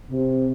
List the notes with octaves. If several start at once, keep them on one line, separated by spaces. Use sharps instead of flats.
C3